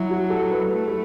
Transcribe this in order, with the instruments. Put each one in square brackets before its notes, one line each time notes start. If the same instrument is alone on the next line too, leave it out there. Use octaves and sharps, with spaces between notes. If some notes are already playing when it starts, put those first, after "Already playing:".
Already playing: [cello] F#3 [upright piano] E4
[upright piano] F#4
A4
B4
[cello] A3
[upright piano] A4